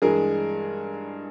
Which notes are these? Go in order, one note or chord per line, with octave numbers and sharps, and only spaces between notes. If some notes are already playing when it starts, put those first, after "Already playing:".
G2 E3 G#3 G#4 A#4